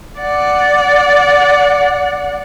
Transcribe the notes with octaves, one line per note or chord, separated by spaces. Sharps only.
D5 F#5